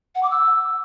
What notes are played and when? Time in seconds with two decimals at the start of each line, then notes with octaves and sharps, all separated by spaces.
0.15 F#5
0.23 D6
0.31 E6